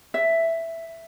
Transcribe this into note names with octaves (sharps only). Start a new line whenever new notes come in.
E5